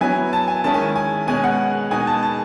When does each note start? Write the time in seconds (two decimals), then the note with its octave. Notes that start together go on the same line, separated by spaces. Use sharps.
0.01 F#3 B3 E4 G#5
0.33 A5
0.48 G#5
0.64 D#3 G#3 C#4 E4 A5
0.74 G#5
0.96 G#5
1.27 B2 G#3 C#4 G#5
1.44 F#5
1.91 B2 G#3 D#4 G#5
2.07 A5
2.23 A5